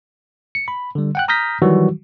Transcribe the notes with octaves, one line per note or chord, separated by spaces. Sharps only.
C#7
B5
D3 G3
F#5 G5 F#6
A#5 D#6 F6 G6 A#6 B6
D#3 E3 F#3 G3 F#4